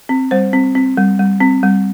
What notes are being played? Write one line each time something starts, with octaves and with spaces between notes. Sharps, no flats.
C4
G3 C5
C4
C4
G3
G3
C4
G3